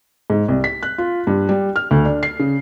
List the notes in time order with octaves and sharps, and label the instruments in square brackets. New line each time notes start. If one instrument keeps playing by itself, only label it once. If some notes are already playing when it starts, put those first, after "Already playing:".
[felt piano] G#2
C2
B6
F#6
F4
G2
G3
F6
D2
D4
C7
C#3